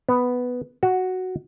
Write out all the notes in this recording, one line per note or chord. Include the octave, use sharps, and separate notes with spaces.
B3
F#4